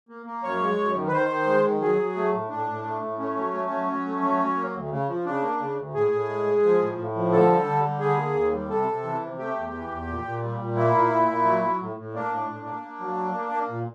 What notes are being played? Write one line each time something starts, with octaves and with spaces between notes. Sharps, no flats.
A#3
A#3
F#2 C#5
G#3
F#2
D#3
B4
D#3 C5
D#3
G#3
D#3
F#3 G#4
F#3
A3
A2
A2 D4
A2
A3
A2
A3 C#4
F#3
A3
F#3
F#3
A3
F#3
F#3
A#3
D2
C#3
F3
C#3 D4
A#3
C#3
D2
A2 G#4
A2
G#3
G#3
F3
A2
A2
F3
D3 A4
G3
D3
G3
D3 G#4
A#3
D#2
G3
C3 A4
C3
E3
C3
A3 G4
E2
E3
E2
A#2
A#2
G3
A#2
A#3 E4
A#2
A#2
A#2
F#3
F#3
A2
A2
A#3 D4
A2
A2
A#3
A#3
F#3
A#3
A#3
A#3
A#2